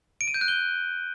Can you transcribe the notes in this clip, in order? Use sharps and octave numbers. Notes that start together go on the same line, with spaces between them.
D7
D#7
G6
F#6
G7